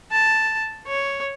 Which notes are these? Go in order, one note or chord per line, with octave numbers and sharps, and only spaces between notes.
A5
C#5